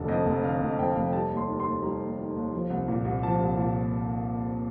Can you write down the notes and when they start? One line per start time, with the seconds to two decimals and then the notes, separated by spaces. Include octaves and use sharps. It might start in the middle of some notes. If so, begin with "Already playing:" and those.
Already playing: F1 D3 A5
0.08 F2 D#5
0.26 F1
0.43 D3 F5
0.61 F1
0.67 D#5
0.79 F2 G5
0.91 F5
0.96 F1
1.13 G3 A5
1.30 D#2
1.37 C6
1.48 D#3
1.60 C6
1.66 D#2
1.83 G3 A#5
2.00 D#2
2.18 D#3
2.35 D#2
2.53 F3
2.70 C2
2.88 A#2
3.05 C2
3.23 F3 A5
3.40 C2
3.58 A#2